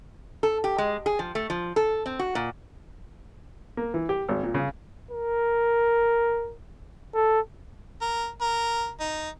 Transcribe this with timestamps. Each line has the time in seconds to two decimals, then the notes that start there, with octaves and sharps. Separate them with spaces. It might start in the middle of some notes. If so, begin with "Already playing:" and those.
0.43 A4
0.64 G4
0.78 G#3
1.06 G#4
1.19 F3
1.35 A3
1.50 F3
1.76 A4
2.06 C4
2.19 F#4
2.35 A#2
3.77 A#3
3.94 E3
4.09 G4
4.29 G#1
4.43 A#2
4.54 C#3
5.11 A#4
7.14 A4
8.01 A#4
8.41 A#4
9.00 D#4